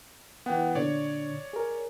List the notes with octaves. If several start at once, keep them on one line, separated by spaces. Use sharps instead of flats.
E3 B3 F#5 G5
A#2 D3 D4 C#5 D5
G#4 A#4